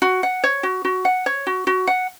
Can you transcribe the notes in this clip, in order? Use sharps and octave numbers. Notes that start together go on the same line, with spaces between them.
F#4
F#5
C#5
F#4
F#4
F#5
C#5
F#4
F#4
F#5